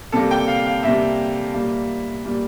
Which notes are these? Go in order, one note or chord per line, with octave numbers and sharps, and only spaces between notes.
C3 G3 A#3 A4
G5
F5
F5
C3 G3 A#3 E5
A#2 G3 A#3
A#2 G3 A#3